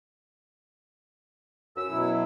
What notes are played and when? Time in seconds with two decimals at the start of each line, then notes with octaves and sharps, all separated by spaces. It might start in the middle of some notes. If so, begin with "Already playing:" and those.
1.76 F#2 E6
1.88 B2 F#3 E4